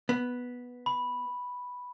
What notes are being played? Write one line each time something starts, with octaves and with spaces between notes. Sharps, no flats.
B3
B5